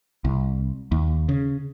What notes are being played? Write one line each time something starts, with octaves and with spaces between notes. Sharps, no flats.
C2
D#2
C#3